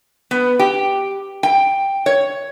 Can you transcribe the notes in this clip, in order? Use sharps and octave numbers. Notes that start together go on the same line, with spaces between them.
B3
G4
G5
C#5